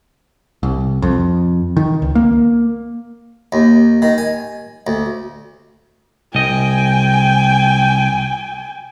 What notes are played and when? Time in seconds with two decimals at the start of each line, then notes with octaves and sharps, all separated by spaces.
0.63 C2
1.02 F2
1.77 D#3
2.02 C#2
2.15 A#3
3.52 D#2
4.02 D#3
4.18 G#5
4.87 D2
6.35 C2 D#5 G5 G#5